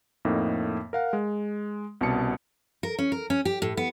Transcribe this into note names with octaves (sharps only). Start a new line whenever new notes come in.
F2 A2 A#3 D#4
A#4 F5 F#5
G#3
C2 B2 C#4 A5 C#7
A#4
C#4
A#4
C#4
G4
A2
B3